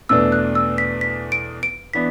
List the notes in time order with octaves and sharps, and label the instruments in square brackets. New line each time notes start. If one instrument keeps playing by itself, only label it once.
[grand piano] E2 B2 A3 D4 [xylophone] E6
[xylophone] F#6
E6
B6
B6
D7
D7
[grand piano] E3 B3 D4 [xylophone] B6